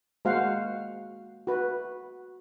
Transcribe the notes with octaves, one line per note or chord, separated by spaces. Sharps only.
G#3 A#3 F#4 C5 F5 F#5
F#4 B4